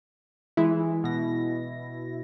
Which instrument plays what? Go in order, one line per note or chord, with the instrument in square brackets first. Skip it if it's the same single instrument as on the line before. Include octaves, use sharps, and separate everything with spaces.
[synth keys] E3 G#3 [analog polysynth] E4
[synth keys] B2 A#6